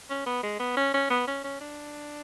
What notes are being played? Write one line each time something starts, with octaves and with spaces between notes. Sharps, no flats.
C#4
B3
G#3
B3
C#4
C#4
B3
C#4
C#4
D4